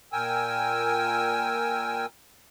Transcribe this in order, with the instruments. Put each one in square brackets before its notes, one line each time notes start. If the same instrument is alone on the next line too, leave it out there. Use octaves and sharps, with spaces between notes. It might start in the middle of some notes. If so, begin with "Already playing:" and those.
[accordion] A#2 A#4 G5 G#5 E6